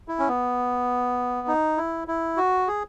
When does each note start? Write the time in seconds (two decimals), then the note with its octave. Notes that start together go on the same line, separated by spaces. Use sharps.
0.08 E4
0.19 C#4
0.28 B3
1.48 D#4
1.77 E4
2.08 E4
2.37 F#4
2.67 G#4